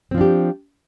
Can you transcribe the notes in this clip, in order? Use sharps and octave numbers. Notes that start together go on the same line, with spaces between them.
F3 C4 D4 G4